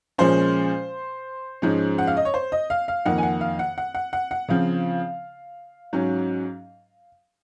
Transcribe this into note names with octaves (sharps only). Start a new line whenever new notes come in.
A#2 F3 G#3 C#4 C5
G#2 F3 G#3 C#4
F#5
F5
D#5
C#5
C5
D#5
F5
F5
F2 D#3 A#3 F#5
G#5
F#5
F5
F#5
F#5
F#5
F#5
F#5
C#3 F3 C4 F5
G#2 F#3 C#4